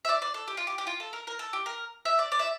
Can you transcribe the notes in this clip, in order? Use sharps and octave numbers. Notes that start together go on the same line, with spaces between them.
E5
D5
D5
A4
G4
F4
G4
G4
F4
A4
A#4
A#4
A4
G4
A#4
E5
D5
D5
E5